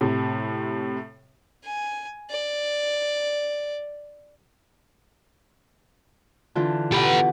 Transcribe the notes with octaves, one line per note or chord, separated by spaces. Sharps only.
A2 C3
G#5
D5
D3 E3 F4
B2 B3 G4 A4 B4